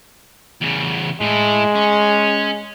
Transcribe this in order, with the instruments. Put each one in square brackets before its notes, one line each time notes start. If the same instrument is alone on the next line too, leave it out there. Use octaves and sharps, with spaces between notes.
[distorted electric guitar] E2 C#3
[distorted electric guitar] A2 E4 [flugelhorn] G#3
[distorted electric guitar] C#4